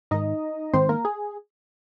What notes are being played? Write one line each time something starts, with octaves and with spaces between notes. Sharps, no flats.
G#2 D#3 D#4 D#5
G#2 D#3 C4 C5
A#3 A#4
G#4